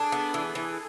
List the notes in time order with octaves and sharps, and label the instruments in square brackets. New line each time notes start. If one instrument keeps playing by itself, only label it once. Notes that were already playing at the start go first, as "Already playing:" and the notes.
Already playing: [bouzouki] D4 [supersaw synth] G#4 A4
[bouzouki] B3
E3
E3